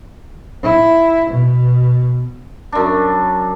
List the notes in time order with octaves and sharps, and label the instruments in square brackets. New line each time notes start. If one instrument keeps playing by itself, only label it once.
[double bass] E4
B2
[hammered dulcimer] F#2 D4